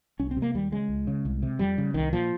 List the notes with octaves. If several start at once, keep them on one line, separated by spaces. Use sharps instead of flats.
C2 C#4
C4
C3
A#3
D#2 G3
C#3 G#3
C#2
C#3
C2
C3
F2 G3
C#3
C2 D#3
A#2 F3